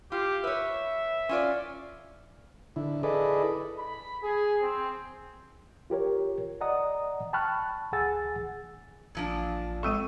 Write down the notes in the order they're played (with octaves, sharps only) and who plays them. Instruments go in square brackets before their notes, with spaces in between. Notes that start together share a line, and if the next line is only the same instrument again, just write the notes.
[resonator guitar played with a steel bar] F4 [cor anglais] G4
[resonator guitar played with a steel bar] B4 C#5 [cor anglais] E5
[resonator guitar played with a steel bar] C#4 F4 D5
[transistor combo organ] D3 E4
E4 G#4 A4 B4 D5 D#5
[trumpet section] B5
G#4
C4
[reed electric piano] F4 G4 A#4 C#5
D5 D#5 F#5 A#5 D#6
G5 A5 B5 C#6 F6 F#6
D2 G#4 F#5 G#5 E6 A6
[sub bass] A1 [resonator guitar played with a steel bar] A#2 F3 D4
[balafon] G#3 C4 A4 [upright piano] C#6 E6 D#7